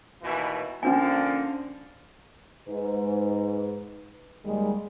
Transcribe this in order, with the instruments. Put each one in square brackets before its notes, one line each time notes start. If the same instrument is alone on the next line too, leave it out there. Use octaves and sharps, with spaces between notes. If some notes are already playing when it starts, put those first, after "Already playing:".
[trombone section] D#2 B2 E3
[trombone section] D3 F3 A#3 [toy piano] C#4 D4 G#5
[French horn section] G#2 B4
D#2 G3 G#3